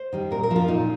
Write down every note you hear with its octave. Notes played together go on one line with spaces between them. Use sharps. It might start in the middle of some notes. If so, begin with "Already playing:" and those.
Already playing: C5
D#3 G3
A#2 A#4
A#4
F3
F4
A#2 D#4